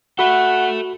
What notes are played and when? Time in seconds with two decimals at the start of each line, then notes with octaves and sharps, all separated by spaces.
0.19 F#4 A4 E5 F#5 B5